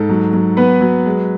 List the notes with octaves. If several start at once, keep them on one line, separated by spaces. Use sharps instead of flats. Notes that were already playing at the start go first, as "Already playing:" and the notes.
Already playing: G#2 A4
F#3
F#3
B3 B4
F#3
G#3